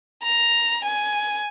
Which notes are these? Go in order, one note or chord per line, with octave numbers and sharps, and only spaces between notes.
A#5
G#5